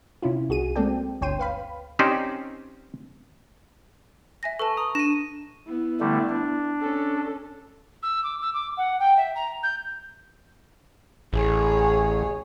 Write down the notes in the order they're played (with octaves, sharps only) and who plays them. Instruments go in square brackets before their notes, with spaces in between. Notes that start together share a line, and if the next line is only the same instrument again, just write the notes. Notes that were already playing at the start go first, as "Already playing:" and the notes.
[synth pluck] C3 C#4 E4 F4
C2 F#4 G#4 D#7
G#3 A#3 C4 A4 D5 G5
G1 D2 C#5 G5 C6 D#7
B4 F5 B5
[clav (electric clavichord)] C4 C#4 D#4 G4 C5 D5
[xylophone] E5 G#5 A#6
[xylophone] A4 B4 A5 [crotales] C#6
[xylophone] A#5 [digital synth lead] D#6
[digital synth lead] D4 [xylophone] A#6 [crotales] D#7 E7
[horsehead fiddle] B3 E4
[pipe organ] D3 G3 A3
D4
[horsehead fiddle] C#4 A4
[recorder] E6
D6
E6
D6
F#5
G5
E5
A#5
G6
[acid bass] A1 [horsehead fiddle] G#4 C#5